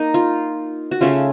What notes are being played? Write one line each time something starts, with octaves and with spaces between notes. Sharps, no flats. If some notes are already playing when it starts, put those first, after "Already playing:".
Already playing: A#3 D#4
F4
F#4
C#3 A3 C#4 F4